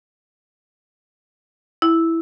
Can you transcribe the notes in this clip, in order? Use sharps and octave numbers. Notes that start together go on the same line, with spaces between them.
E4